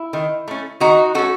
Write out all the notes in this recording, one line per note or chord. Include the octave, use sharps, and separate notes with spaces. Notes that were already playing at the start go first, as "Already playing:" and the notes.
Already playing: E4
D#3
A3 C#4
D#3 D#4 F#4
A3 C#4 F#4 A4